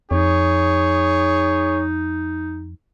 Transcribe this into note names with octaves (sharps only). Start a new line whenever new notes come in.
F2 D#4 G#4 C#5